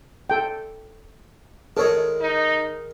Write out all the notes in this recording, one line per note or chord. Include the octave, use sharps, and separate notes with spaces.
A4 G5
D#3 G#3 A4 C#5 D#5
D#4